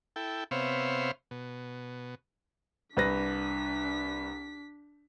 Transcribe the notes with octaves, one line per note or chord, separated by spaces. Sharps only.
E4 A4 G5
C3 B3 C5 C#5 E5 F5
B2
C2 D4 B4 A#6 B6